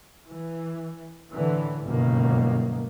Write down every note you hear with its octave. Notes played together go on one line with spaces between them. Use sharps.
E3
A2 D3 E3
G1 C#2 F#2 B2 D#3 A#3